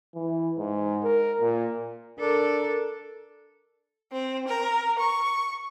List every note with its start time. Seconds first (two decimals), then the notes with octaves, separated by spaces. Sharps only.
0.15 E3
0.57 G#2
1.03 A#4
1.40 A#2
2.20 D4 A4 A#4
4.12 C4
4.47 A#4
4.98 C#6